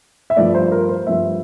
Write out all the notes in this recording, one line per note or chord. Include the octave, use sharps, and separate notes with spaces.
E5
G2 F3 A3 D5
C5
A#4
C5
G2 F3 A3 E5